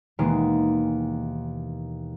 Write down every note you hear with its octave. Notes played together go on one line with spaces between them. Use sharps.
D#2 B2 E3 G#3 A#3